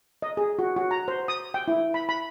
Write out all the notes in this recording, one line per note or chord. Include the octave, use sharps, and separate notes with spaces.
D#5
G#4
F#4
F#4
A#5
C5
D#6
G5
E4
B5
B5